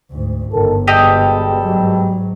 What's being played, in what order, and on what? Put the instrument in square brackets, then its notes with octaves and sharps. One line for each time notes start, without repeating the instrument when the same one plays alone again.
[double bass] D2 G#2
[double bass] G1 [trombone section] D#3 A4
[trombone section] B2 G3 G#3 [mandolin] G4 A4 D#5
[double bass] G#2 F#3